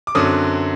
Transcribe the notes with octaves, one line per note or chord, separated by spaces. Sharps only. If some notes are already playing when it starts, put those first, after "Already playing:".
D6
F#2 D3 F#3 C4 D#6